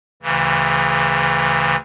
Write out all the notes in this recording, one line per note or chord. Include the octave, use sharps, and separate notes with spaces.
D2 C#3 E3